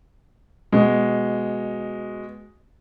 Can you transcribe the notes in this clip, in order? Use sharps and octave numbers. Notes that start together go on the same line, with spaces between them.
B2 G#3